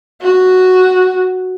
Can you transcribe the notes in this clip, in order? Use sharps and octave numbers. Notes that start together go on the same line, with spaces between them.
F#4